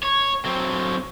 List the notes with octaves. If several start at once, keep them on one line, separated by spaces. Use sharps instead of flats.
C#5
F#3 C4